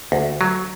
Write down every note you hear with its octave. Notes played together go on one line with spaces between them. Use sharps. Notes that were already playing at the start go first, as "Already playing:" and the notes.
D2
F#3